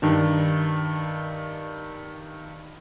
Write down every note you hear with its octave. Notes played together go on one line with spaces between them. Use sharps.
G2 D#3 D4